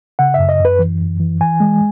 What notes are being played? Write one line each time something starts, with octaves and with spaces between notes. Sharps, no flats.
C#3 F#5
E5
F#2
D#5
F#2
B4
E3
F#2
E3
E3 G#5
G#3